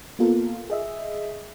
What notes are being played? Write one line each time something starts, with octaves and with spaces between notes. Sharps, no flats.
A#3 B3 F4 A4 A#4
G#4 D#5 E5